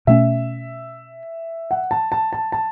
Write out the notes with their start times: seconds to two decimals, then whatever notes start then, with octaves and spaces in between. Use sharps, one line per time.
0.07 B2 A3 C#4 E5
1.71 F#5
1.91 A5
2.12 A5
2.33 A5
2.52 A5